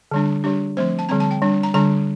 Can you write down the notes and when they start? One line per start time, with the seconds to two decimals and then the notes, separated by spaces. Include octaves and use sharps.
0.11 D3 G3 D4
0.44 G3 D4 G4
0.77 F3 A3 C4 C5
0.99 A5
1.09 D3 G3 C4 A#5
1.20 A5
1.31 G5
1.42 G3 D4
1.63 A#5
1.74 D3 G3 D4 A#5